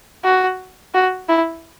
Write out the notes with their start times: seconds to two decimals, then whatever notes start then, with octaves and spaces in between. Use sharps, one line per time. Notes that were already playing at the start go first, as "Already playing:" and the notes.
0.24 F#4
0.94 F#4
1.29 E4